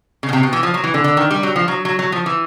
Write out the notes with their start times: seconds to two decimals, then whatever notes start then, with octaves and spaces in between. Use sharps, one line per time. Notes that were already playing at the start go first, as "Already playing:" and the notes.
0.23 C#3
0.29 B2
0.33 C3
0.43 B2
0.53 E3
0.63 F3
0.74 F#3
0.84 E3
0.94 D3
1.04 D3
1.17 D#3
1.31 G3
1.43 F#3
1.56 F3
1.68 F#3
1.85 F#3
1.99 F#3
2.12 F3
2.26 E3